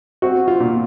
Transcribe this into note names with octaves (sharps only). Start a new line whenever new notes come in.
C4 F#4
F4
A#2